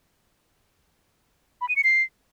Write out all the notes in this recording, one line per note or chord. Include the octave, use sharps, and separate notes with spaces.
B5
D#7
C#7
C7